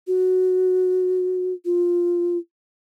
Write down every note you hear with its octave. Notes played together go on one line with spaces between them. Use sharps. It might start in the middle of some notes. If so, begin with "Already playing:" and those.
F#4
F4